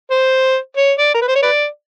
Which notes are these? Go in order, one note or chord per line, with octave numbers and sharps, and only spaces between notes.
C5
C#5
D5
A#4
B4
C5
C#5
B4 D5